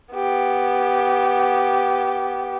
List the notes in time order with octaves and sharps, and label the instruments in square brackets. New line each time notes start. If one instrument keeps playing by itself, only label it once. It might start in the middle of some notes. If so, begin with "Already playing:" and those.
[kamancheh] B3 G4